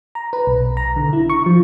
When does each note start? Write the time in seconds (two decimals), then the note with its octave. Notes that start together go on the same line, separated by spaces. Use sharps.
0.15 A#5
0.33 B4
0.47 B1
0.77 A#5
0.96 D3
1.13 E4
1.30 C#6
1.46 F3